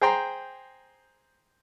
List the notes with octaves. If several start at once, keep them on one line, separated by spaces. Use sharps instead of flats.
G#4 C5 G5 A#5 C6